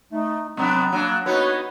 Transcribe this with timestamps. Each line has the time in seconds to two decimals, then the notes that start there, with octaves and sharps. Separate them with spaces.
0.12 A3 D#4
0.57 C3 F#3 G#3 B3 C4 D4 A#5
0.92 F#3 A#3 D4
1.26 B3 D#4 F#4 B4 C#5